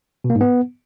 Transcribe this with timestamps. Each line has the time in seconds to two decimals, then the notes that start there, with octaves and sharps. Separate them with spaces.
0.24 B2
0.30 A#3
0.35 G#2
0.41 B3